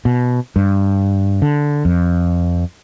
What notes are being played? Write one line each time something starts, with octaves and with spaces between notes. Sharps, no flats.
B2
G2
D3
F2